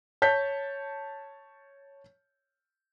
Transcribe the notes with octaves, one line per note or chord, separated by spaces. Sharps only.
C#5 A5 G6 B6